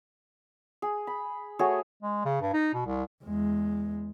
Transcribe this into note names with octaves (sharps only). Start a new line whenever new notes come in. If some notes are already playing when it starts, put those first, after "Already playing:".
G#4
B5
A3 F#4 G#4 C#5
G#3
C#3
G2
D#4
B2
C2
E2 G#3